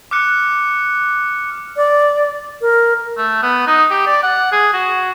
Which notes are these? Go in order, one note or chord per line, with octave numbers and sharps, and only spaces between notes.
D6 F6 F#6 C#7
D5
A#4
A3
B3
D#4
G4
D5
F#5
G#4
F#4